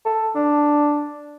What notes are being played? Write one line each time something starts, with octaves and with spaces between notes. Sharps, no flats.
A4
D4